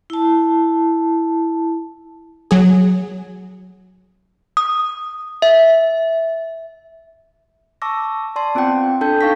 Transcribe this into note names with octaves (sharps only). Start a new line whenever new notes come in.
E4 A5
F#3 G#4
D#6
E5
A5 C#6 D6 E6 A#6
D5 A5 C6
B3 C4 F4 F#5 G5
D4 A4 G5 A5 G6
D#4 F5 C#6 A#6 B6